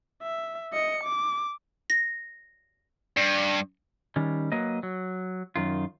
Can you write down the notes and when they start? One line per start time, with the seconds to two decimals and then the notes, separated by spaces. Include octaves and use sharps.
0.22 E5
0.73 D#5 C#7
1.04 D6
1.90 A#6
3.17 G2
4.16 D#3 G3 C#4
4.52 F#3 A#3 B4 D#5
4.83 F#3
5.56 F#2 D#3 F4